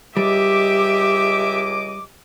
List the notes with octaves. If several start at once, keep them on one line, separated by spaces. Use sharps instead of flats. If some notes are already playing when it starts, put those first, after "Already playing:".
C#2 G3 G4 D#5 E5 D6